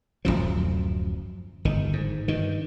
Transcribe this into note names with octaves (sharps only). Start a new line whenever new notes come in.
D1 G#1 F#2 F3
G1 D#3
G#2
G2 D#3